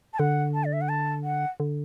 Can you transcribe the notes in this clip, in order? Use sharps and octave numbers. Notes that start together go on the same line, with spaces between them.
A5
D3 F#5
A5
D5
E5
F#5
A5
F#5
D3